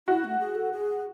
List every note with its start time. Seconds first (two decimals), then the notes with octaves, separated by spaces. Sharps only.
0.08 E4 F#4
0.24 A3
0.40 G#4
0.55 A4
0.72 G#4